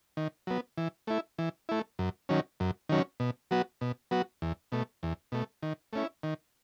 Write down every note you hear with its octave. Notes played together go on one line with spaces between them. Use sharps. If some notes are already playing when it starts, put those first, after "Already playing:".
D#3
F#3 B3
E3
A3 E4
E3
A3 E4
F#2
D#3 F#3 C#4
F#2
D#3 F#3 C#4
B2
F#3 B3 F#4
B2
F#3 B3 F#4
E2
B2 A3
E2
B2 A3
D#3
A3 C#4 E4
D#3